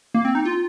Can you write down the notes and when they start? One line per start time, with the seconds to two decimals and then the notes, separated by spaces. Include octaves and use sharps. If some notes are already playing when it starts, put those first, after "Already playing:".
0.14 A#3
0.25 C4
0.35 D#4
0.45 F4